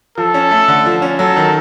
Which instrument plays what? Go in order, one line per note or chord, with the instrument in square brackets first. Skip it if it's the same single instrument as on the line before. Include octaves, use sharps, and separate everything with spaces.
[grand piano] F3 [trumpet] A4
[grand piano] C#4
A3
D3
F3
C#4
[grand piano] F#3 [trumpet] A4
[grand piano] D#3